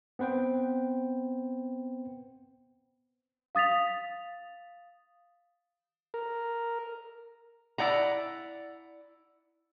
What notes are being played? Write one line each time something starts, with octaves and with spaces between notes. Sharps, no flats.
B3 C4 B4 C5 G5
F5 D#6 A6 B6 F7
A#4
E4 D5 F#5 A#5